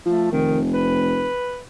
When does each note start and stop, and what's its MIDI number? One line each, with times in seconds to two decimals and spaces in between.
0.06 0.28 53
0.06 0.31 57
0.32 1.31 29
0.32 0.58 51
0.74 1.61 71